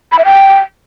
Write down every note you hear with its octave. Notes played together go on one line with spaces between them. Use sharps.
B5
E5
G5